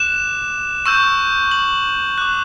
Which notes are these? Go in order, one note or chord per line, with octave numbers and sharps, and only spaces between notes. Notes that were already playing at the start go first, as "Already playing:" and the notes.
Already playing: D6 F#6 E7
C#6 E6 G6 E7
F#7
D6 F#6